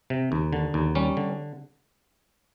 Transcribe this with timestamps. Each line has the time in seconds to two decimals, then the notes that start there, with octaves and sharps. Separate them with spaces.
0.10 C3
0.32 D#2
0.53 D3
0.74 D#2
0.95 G3 C#4
1.17 D3